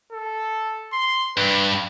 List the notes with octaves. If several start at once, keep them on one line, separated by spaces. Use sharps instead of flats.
A4
C6
G2 B4